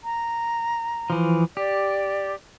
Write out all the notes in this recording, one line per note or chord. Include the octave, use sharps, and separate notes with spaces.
A#5
E3 F3
G4 D5